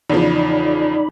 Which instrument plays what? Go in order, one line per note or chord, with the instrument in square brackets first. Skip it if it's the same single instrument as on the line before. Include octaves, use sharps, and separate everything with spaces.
[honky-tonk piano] E2 C#3 F3 [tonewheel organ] D#4 D5 B5